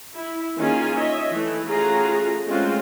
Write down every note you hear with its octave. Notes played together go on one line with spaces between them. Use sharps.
E4
D#3 A#3 C#4 F4 G#4 G#5
C#5 D#5 E5
E3 A3
A3 C#4 F4 F#4 G#4 A#5
G#3 A3 C4 C#4 F4 F#4